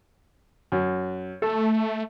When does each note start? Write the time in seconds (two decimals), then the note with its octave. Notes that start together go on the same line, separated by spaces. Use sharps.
0.72 F#2
1.42 A3 A4